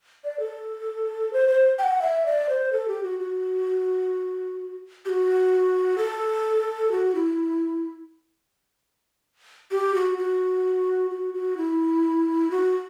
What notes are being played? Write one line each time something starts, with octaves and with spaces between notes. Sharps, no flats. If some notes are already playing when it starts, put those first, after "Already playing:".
D5
A4
C5
C5
G5
F#5
E5
D5
C5
A4
G4
F#4
F#4
G4
F#4
A4
F#4
E4
G4
F#4
F#4
F#4
F#4
E4
F#4